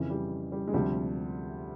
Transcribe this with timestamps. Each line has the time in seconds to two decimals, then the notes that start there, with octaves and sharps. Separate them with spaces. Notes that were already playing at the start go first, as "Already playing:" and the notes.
Already playing: F2 C#3 E3
0.10 G3
0.52 G3
0.67 G#3
0.74 D2 C3 F3 G3